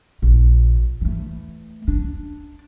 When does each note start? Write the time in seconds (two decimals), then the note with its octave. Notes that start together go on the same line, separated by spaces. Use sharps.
0.22 A#1
1.01 E3 A3
1.88 D4